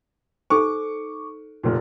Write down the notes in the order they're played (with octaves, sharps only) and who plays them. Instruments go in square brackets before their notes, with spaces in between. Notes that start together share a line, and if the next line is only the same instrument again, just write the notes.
[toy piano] D#4 A4 C5 [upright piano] C#6 D6
[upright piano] F1 A#2